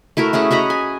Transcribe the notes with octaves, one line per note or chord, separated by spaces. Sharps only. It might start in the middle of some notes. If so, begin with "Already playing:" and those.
A3 E4 F#4 A#4
A3 C#4 G#4 F#5
F#4 D#5 A#5 B5
G#5